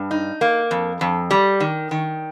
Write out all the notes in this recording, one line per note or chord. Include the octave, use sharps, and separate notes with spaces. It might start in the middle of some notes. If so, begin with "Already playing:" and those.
Already playing: G2
D#4
A#3
F2
F2
G3
D#3
D#3